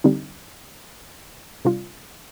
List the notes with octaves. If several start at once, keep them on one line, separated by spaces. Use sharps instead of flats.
D3 G3 C4 D#4
C3 G3 D4 F4